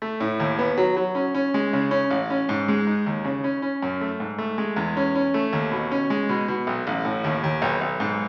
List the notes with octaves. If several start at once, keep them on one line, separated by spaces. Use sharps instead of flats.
A3
A2
D#2
B3
F#3
F#3
C#4
C#4
G#3
C#3
C#4
A1
C#4
G#2
G#3
D#4
D#2
C#3
C#4
C#4
F#2
A3
G#2
A3
G#3
E2
C#4
C#4
A3
D#2
B2
C#4
G#3
B2
B2
B1
A1
A2
D#2
D#2
B1
B1
G#2